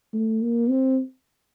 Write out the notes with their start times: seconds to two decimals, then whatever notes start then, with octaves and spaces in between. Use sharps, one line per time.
0.14 A3
0.42 A#3
0.69 C4